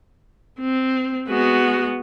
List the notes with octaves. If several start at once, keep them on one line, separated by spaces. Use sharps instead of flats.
C4
G#3 B3 F#4